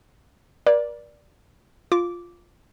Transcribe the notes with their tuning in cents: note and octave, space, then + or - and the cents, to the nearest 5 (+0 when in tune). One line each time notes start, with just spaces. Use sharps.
A#4 +45 D5 +0
F4 +0 D6 -10